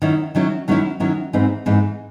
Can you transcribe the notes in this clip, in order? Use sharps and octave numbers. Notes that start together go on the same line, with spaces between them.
D#3 F#3 C#4 E4
D#3 F#3 C#4 E4
D#3 F#3 C#4 E4
D#3 F#3 C#4 E4
G#2 E3 C4 D#4
G#2 E3 C4 D#4